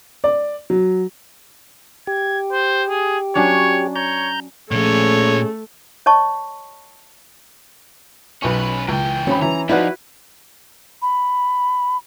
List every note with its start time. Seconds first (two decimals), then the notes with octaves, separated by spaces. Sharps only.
0.24 D5
0.70 F#3
2.07 G4 G#6
2.53 C5
2.89 G#4
3.35 F#3 C#4 D4 C#5
3.96 C#5 A#5 G6
4.72 A#2 F3 A3 C#4 G#4 C#5
6.06 C#5 D#5 A5 C#6
8.42 B1 C#4 B4 C#6
8.88 C#2 E3 G5
9.27 G#1 C#4 B5
9.42 E3 A#5
9.69 F3 D#4 E4 F#4 B4 D5 F#5
11.02 B5